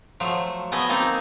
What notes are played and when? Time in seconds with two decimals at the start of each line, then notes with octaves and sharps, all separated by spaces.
0.20 F3 F#3 A3
0.72 A3 B3 D#5 E5 G#5
0.89 A#3 C4 D#4 A4